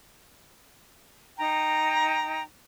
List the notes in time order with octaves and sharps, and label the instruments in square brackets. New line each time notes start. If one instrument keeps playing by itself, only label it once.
[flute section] D#4 G5 A#5